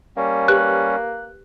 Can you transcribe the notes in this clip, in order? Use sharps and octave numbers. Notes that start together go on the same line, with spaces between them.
G3 A#3 C#4
G4 B4 F#6